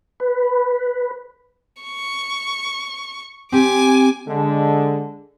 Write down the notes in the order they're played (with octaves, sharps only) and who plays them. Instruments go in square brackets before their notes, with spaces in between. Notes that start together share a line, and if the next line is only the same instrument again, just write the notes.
[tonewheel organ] B4
[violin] C#6
[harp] C4 G4 [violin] G#5 D6
[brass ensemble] D3 G#3